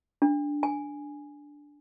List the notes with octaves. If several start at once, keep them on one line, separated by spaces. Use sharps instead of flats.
D4
G#5